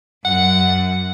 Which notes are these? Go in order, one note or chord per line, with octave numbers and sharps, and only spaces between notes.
F#2 F#5